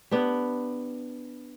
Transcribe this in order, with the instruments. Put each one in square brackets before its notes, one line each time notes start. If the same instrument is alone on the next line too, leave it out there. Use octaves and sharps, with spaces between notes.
[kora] B3 D4 G4